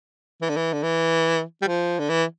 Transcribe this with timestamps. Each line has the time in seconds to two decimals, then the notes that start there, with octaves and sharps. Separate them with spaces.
0.41 E3
0.49 D3
0.57 E3
0.73 D3
0.83 E3
1.62 G3
1.68 F3
1.99 D3
2.09 E3